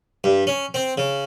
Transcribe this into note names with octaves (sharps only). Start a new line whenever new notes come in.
G2
C#4
C4
C#3